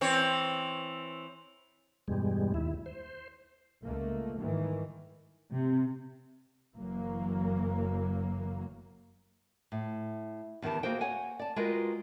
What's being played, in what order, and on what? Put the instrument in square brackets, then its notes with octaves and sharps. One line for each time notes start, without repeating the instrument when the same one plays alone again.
[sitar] E3 C4 C#5
[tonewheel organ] E2 G2 B2 G3 G#3
D#2 E4
C5
[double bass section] C#2 A3 A#3
G#2 D#3 E3 G3
[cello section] C3
[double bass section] F#1 F#2 E3 F#3 A#3
[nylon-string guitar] A2
E2 D#3 B3 G4 A5
A#3 F#4 G#4 C5 G5
C#5 F#5 G#5
D5 A5
G#3 F4 F#4 A#4 B4 G5